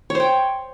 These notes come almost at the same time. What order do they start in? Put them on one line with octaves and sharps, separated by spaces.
C#5 C5 G5